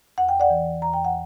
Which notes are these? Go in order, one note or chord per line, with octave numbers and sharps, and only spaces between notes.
E2 F#5
G5
D5 F#5
E3
E2 A#5
G5
F#5